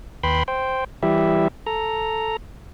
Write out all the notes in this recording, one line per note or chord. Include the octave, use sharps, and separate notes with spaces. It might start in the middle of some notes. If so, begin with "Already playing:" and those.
D#2 B4 G5 B5 C6
C5 G5
E3 G3 E4 G4 E5
A4 A#5